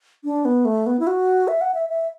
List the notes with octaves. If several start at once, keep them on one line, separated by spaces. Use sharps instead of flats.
D4
B3
A3
B3
E4
F#4
E5
F#5
E5
E5